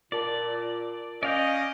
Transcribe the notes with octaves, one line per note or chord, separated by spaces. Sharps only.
A#2 F4 A#4 D5 A5
C#4 D5 D#5 F5 G6